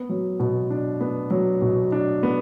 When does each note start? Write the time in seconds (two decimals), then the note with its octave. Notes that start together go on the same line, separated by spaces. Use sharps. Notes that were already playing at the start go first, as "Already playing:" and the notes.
Already playing: B3
0.09 F#3
0.40 B2
0.70 D4
1.01 B3
1.30 F#3
1.62 B2
1.92 D4
2.23 B3